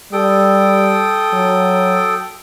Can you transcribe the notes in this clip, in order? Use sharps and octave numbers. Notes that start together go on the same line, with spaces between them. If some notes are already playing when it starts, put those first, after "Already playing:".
G3 A4 G5 D#6
F#3